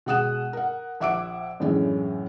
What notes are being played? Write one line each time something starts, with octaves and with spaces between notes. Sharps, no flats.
B2 G#3 F#5 D#6 F#6 E7
A#4 F#5
A#1 E5 F#5 D6 E6 D7
F#2 A2 E3 G#3 C#4 D4